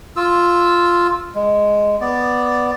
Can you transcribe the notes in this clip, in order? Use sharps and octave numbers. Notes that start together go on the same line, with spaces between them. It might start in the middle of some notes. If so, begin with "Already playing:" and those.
F4 E6
G#3
B3 D5